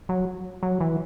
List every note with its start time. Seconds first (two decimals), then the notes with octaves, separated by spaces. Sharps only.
0.09 F#3
0.63 F#3
0.81 E3